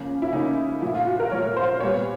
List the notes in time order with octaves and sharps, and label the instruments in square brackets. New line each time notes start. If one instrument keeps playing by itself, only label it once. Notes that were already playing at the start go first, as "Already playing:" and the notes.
Already playing: [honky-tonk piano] C#3 F3 A#3 C#4
E4
C#3 F3 A#3 C#4 D#4
A#2 F3 A3 E4
F4
F#4
A#4
A#2 F3 A3 C#5
C5
A#2 G3 B3 C#5